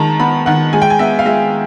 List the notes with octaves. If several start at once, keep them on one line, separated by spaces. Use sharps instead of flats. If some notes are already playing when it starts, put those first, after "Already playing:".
Already playing: D#3 G#3 A5 A#5
B3 B5
D#3 F#5
G#3 G#5
G5
G#5
B3 E5
F5
G#3 E5